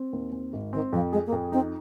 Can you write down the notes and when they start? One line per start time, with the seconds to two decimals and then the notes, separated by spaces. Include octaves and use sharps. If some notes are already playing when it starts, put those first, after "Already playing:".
Already playing: C4
0.13 D#2
0.33 C4
0.53 G#1
0.73 D#3 C4
0.93 F2 F3
1.12 G#3 G#4
1.26 A#3
1.32 F2
1.52 C4 D#4